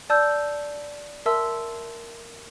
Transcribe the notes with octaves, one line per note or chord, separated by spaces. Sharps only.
D5 A5 E6 G6
A#4 E5 A5 C6 E6